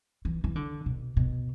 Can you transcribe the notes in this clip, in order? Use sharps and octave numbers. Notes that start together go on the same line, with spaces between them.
E3
E3
D3
B2
B2